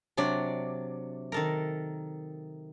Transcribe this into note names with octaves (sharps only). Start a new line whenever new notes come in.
C3 F#3 D4 D5
D#3 A4 A#4